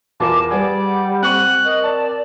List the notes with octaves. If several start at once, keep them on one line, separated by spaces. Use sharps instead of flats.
E2 F4 A#4 A5 D6
G3 G#4 B4 D5 F#5
C4 C#6 F#6 D#7
A#4 D#5
D5 A5